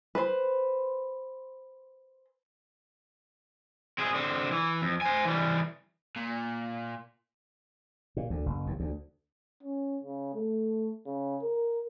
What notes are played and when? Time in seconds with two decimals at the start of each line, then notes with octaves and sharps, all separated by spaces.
0.15 B4 C5
3.98 C4 G#4
4.14 D3 C4
4.52 E3
4.82 F2
5.01 C5 G#5
5.25 E3 G3
6.16 A#2
8.17 A#2
8.30 D2
8.46 F#1
8.67 D#2
8.80 D2
9.63 C#4
10.03 C#3
10.34 A3
11.06 C#3
11.42 A#4